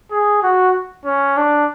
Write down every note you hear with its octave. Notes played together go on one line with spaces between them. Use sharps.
G#4
F#4
C#4
D4